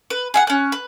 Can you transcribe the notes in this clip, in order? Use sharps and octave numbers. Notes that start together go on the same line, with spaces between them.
B4
G#4 E5 F#5
C#4 F#6
B4